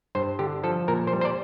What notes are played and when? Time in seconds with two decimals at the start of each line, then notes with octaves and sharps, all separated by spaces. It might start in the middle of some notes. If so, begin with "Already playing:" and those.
0.15 G2 C5
0.39 D3 G4
0.63 F3 A4
0.88 A#2 A#4
1.07 C5
1.13 G3
1.21 C5
1.25 D5